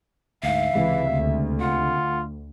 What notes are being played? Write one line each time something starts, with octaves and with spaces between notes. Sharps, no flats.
D2 G#2 E5 F5
C#2 C3 E3 G#3
D2
F4 F#5